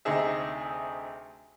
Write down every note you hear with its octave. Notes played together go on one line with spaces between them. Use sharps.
D2 C3 D#4 G#4 E5